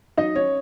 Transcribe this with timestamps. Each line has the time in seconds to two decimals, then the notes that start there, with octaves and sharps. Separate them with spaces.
0.17 F#3 D#4 D#5
0.35 C#4 C#5